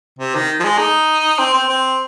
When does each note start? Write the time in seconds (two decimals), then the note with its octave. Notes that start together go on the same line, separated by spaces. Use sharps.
0.19 C3
0.35 D#3
0.60 F3
0.64 G#3
0.79 D#4
1.39 C4
1.54 C4
1.69 C4